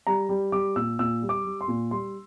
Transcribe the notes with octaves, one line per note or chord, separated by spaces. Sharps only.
G3 A#5
G3
G3 D6
A#2 E6
A#2 E6
G3
D6
G3
C6
A#2
G3 C6